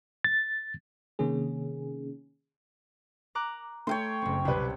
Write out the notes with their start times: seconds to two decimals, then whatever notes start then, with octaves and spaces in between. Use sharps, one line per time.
0.24 A6
1.19 C3 D#3 A#3 C#4 G#4
3.35 A#5 D6 F#6
3.87 A3 C#5 G5 C6
4.22 F#1 C4
4.45 C2 B2 G4 B4